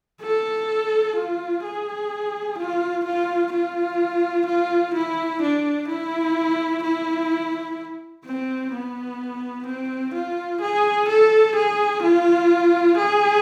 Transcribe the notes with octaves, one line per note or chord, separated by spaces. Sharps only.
A4
F4
G#4
F4
F4
F4
F4
E4
D4
E4
E4
C4
B3
C4
F4
G#4
A4
G#4
F4
G#4